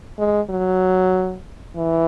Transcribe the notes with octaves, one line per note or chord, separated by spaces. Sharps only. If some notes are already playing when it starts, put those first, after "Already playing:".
G#3
F#3
E3